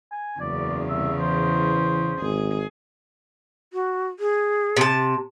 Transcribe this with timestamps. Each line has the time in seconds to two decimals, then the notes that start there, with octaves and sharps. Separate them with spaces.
0.12 G#5
0.40 F#1 E2 C#3 D5
0.89 C2 E5
1.20 E3 C5
2.21 G#1 G#4
3.73 F#4
4.19 G#4
4.77 C3 A5